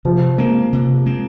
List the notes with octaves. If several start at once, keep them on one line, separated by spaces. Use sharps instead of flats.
C3 F3
G#3 A#3 C4
C3
G#3 C4